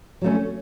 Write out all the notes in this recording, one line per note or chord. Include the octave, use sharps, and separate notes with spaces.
F#3 A3 C#4